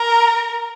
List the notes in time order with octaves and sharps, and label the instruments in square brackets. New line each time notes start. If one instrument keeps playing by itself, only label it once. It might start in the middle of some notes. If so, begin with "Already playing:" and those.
Already playing: [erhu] A#4